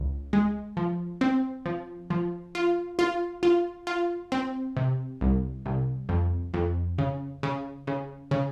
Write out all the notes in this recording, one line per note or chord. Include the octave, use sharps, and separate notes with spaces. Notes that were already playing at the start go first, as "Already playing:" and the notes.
Already playing: C#2
G#3
F3
C4
F3
F3
F4
F4
F4
F4
C4
C3
C2
C2
F2
F2
C#3
C#3
C#3
C#3